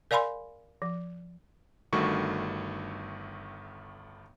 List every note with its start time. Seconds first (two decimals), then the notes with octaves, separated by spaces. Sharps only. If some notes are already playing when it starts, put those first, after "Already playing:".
0.11 A#4 D5 F5 G#5 B5 C6
0.82 F3
1.93 G1 G2 D#3 A3 F#4 C#6